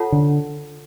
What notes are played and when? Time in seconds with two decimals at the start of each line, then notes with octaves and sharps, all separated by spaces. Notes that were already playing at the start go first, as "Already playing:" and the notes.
Already playing: F4 A4 C#5 F#5 A5
0.12 D3